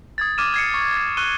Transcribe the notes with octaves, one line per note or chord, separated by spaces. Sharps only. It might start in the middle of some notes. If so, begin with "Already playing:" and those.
D#6 G#6 A6
D6 F6 G#6 D#7 E7
G#6 C7 C#7
C#6
G#6 C7
C#6 F6 F#6 D#7 G7